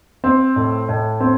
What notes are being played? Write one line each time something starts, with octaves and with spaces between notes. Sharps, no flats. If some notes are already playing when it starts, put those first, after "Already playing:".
C4
A2
A2
C4